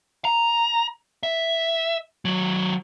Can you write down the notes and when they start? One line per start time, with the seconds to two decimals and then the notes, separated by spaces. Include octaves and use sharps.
0.25 A#5
1.23 E5
2.25 D#3 F#3